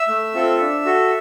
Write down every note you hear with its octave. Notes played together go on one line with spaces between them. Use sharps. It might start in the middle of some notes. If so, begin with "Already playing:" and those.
Already playing: E5 E6
A3
C4 F4 A4
D4
F#4 A4